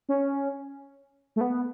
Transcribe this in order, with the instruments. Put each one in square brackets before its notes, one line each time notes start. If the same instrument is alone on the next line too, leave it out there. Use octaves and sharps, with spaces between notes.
[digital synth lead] C#4
A3
B3